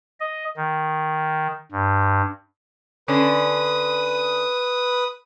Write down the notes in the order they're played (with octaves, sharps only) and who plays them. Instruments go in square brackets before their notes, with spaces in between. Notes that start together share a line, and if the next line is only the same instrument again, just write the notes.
[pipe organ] D#5
D#3
G2
[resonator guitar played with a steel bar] D3 C#4 D4 [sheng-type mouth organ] B4 D#6